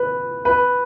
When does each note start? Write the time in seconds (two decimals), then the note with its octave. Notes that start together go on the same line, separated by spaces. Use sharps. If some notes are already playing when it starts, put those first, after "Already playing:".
Already playing: B4
0.45 B4